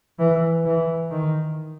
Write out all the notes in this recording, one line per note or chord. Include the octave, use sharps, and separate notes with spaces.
E3
E3
D#3